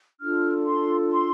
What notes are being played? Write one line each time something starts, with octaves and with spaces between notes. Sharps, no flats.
D4 F4 A4 F6
C6
C6